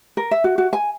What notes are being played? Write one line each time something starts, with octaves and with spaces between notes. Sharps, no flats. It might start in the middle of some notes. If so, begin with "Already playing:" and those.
A#4
E5
F#4
F#4
G#5